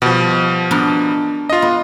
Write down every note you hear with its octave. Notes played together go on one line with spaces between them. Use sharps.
B2 F3 G3
B3 D4 A#4
F4 D#5
B3